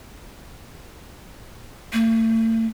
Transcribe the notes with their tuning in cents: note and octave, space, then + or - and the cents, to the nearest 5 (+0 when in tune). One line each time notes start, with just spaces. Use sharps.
A3 +40